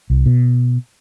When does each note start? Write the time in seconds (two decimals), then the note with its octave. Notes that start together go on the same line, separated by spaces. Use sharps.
0.10 C2
0.26 B2